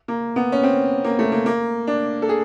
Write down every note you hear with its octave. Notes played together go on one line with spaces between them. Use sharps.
A#3
B3
C#4
C4
A#3
A3
A#3
A#3
D4
A4
G#4